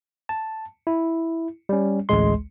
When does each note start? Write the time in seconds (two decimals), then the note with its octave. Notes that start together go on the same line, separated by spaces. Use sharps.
0.29 A5
0.87 E4
1.69 G3 C#4
2.09 A1 D2 G#3 C6